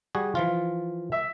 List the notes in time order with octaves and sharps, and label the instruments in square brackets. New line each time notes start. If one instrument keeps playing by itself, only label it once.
[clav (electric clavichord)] G3 F#4 G#4
E3 F3 F4
[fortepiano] E5